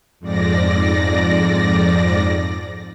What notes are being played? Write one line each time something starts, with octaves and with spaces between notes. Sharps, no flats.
F2 G#2 D5 A#6